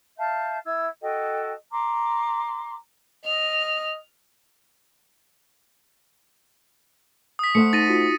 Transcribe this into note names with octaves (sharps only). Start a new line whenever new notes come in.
E5 F5 A5 G6
E4 E6 G#6
F#4 A4 D#5 G5
A#5 C6 D6
D#5 F6
D#6 B6
A3 C5 F#5 C#7
D#4 A6 A#6 D#7
D#4 F4 F#4